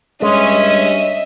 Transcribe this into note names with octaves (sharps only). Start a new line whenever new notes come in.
G2 G#3 C#4 D#5 E5